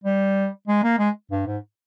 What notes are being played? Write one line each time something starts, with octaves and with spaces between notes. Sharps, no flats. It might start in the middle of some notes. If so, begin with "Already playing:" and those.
G3
G#3
A#3
G#3
G2
G#2